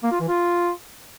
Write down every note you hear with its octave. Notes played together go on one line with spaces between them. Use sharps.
A#3
F4
E3
F4